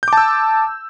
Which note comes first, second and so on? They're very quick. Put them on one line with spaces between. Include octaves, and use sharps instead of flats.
G6 D6 A5 E6